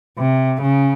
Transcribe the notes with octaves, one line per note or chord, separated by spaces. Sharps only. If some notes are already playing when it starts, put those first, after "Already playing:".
C3
C#3